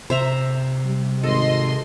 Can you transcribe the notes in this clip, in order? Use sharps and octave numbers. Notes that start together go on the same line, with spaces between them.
C3 C5 E5 A#5
G3
G#1 A4 D#5 C6